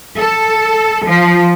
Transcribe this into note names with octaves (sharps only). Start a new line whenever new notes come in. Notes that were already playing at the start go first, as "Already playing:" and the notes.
A4
F3